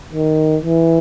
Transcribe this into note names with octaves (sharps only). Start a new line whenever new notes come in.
D#3
E3